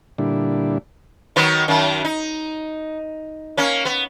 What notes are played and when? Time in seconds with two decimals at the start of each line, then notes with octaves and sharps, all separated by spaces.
0.18 A#2 D3 G3 D4 E4
1.36 D#3 F#3 B3
1.68 F#2 D#3
2.05 D#4
3.57 A#3 C#4
3.85 B3